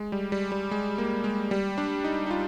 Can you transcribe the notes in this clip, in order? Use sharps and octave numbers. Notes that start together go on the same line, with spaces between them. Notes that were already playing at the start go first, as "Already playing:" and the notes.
Already playing: G#3
G3
G3
G3
G#3
A#3
G#3
G3
D4
D#4
D#4
F4